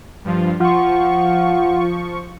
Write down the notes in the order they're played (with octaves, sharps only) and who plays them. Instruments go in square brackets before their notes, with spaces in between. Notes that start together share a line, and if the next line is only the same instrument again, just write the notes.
[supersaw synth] G2 F3 F4
[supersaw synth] F3 C#6 [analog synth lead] F4 [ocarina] F#5